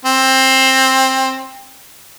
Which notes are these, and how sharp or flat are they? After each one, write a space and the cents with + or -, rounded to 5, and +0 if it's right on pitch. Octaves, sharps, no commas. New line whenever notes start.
C4 +15